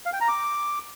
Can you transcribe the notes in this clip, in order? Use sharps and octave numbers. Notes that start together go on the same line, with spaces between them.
F5
G5
A#5
D6